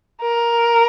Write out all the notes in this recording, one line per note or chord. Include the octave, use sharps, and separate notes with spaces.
A#4